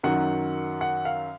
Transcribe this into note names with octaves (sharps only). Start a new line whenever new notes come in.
F#2 D#3 F#3 F#5
F#5
F5